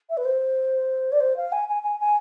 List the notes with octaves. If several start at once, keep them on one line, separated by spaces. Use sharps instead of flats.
E5
B4
C5
D5
C5
F5
G#5
G#5
G#5
G#5